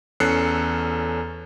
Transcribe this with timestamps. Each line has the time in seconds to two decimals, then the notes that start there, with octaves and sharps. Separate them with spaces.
0.20 E2 C#4 A4 F#6 C7 C#7